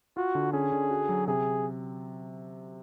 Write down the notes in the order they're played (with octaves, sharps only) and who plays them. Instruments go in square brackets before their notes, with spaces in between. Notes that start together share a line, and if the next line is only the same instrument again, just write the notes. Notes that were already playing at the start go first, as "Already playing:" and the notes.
[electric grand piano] F4 [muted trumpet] F#4
[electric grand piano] D3
[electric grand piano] C#4 [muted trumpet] G#4
[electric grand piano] D3
F#4
F#3
[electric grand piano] C3 [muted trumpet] G#4